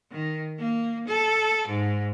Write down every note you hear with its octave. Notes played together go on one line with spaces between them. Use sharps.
D#3
A#3
A4
G#2